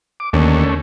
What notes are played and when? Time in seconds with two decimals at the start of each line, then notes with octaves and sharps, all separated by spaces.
0.20 D6
0.33 D#2 D3 A3 C#4